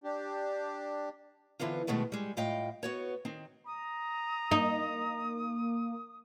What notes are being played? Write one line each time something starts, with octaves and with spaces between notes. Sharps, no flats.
D4 G4
D3 E3 B3 C4 F4
B2 D#3 G#3 A3 B3
G3 G#3
A2 F4 D#5 F5 G5
B3 F#4 C#5
D#3 C4 D#4
A#5 D#6
A#3 D#4